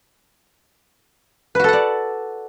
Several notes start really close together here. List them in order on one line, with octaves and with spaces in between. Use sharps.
B4 F#4 A4 F#5 D5